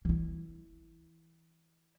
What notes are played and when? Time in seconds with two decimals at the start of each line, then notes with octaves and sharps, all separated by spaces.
0.05 E3 E4